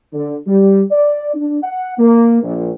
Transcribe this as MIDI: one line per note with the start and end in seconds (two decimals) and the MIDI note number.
0.13 0.37 50
0.47 0.83 55
0.91 1.32 74
1.34 1.58 62
1.63 1.92 78
1.98 2.40 58
2.43 2.70 34